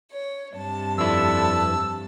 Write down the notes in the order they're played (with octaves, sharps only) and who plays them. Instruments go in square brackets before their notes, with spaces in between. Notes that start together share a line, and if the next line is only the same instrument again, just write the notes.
[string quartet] C#5
G2 C3 A5
[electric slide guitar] F2 E4 [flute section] A4 B4 D5 [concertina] E6